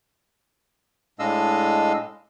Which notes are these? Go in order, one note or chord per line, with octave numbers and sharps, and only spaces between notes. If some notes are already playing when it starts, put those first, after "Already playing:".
A2 G#3 D4 D#5 F5 E6